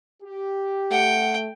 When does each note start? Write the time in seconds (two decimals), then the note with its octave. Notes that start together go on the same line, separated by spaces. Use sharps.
0.23 G4
0.91 A3 F#5 G5